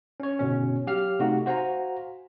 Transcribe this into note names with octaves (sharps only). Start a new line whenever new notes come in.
C#4 C#5
G1 B2 C#4
F#3 G4 F5 F6
C3 A3 D#4 F#4
F#4 C5 F5 G#5 A#5